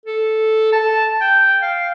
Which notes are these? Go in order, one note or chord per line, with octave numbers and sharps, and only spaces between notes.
A4
A5
G5
F5